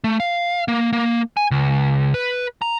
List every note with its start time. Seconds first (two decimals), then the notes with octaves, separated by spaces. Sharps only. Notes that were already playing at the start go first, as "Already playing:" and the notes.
0.04 A3
0.20 F5
0.68 A#3
0.93 A#3
1.37 G#5
1.51 C#2
2.14 B4
2.62 A#5